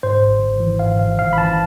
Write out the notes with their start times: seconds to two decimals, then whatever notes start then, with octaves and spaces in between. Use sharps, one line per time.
0.03 G#2 C5
0.23 G#1
0.42 G#1
0.60 E3
0.79 G#2 F5
0.99 G#1 F5
1.19 G#1 F5
1.33 B5
1.37 E3 A5